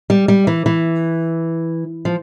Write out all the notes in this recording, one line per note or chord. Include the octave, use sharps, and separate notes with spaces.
G3
G3
E3
E3
F3